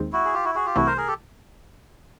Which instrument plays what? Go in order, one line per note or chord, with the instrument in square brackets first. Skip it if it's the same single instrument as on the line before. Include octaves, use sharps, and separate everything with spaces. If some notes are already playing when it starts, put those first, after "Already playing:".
Already playing: [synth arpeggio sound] D#2 D#3 G#3 C4
[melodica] E4 F#4
G#4
F4 G4
E4 F#4
F#4 G#4
F4 G4
[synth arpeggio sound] C2 C3 E3 A3 [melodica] E4 F#4
[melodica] A#4 C5
G#4 A#4
G4 A4